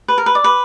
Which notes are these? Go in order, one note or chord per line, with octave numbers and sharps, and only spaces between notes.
B4
A#4
B4
D5
B4